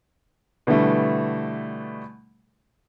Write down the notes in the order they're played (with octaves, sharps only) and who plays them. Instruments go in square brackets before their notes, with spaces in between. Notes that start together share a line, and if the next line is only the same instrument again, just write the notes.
[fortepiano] B2 D3 E3 G3 A3